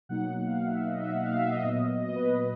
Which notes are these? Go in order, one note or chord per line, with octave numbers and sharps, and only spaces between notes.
B2 F#3 A#3 D#4 F#5
F5
E5
D#5
E5
F#5
F5
E5
D#5
A#2 F#3 B3
D#5
B4
B4